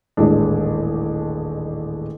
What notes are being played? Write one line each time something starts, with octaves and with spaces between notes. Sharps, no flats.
D#1 A1 G#3 D4